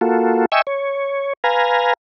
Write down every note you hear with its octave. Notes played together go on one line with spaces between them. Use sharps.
A#3 F4 F#4 A4
D#5 E5 G5 G#5 C#6 E6
C#5
B4 F5 G#5 A#5